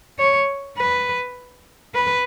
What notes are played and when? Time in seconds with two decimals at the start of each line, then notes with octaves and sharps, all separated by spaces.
0.19 C#5
0.78 B4
1.94 B4